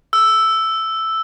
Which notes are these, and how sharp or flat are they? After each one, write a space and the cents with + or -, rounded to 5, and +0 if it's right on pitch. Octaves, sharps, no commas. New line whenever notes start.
E6 +0